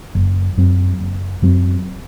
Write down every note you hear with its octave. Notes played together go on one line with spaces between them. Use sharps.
F#1
F#2 F#3 C4
F#1
F#2 F#3 C4